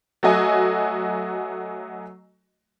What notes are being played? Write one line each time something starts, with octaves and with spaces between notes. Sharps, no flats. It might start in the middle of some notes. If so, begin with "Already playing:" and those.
F#3 A3 F#4 D#5 G#5